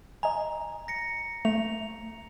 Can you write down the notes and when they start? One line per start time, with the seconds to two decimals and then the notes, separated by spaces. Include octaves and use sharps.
0.23 D#5 G#5 A#5
0.88 A#6 C#7
1.45 A3 F7